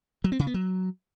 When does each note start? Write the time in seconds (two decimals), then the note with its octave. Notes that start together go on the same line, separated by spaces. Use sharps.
0.24 F#3
0.32 C4
0.39 C#3
0.47 B3
0.54 F#3